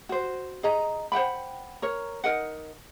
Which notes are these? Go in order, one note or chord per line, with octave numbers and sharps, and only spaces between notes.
F#4 C5
G#4 D#5 A#5
C5 F#5 G5 B5
A#4 C#5
D#4 A#4 D#5 F#5